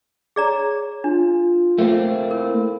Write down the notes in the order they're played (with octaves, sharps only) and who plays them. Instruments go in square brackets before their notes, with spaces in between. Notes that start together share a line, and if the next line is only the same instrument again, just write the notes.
[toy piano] G#4 D5 A#5 [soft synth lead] C#5
[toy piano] D4 [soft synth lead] F4
[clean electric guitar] A3 A#3 C4
[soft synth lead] E4 [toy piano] A#4